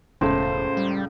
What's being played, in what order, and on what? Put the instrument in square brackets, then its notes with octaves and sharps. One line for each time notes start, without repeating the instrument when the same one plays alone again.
[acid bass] E1 [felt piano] C#2 [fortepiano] A2 [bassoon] C5
[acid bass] G3